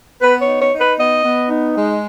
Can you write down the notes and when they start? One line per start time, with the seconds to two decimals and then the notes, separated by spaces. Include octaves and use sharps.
0.21 B3 B4
0.40 C#5
0.46 D#4
0.59 C#5
0.72 D#4
0.79 B4
0.97 B3 D#5
1.23 B3
1.49 D#4
1.76 G#3